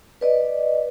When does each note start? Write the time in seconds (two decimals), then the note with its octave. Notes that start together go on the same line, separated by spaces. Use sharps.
0.21 B4 D5 D#5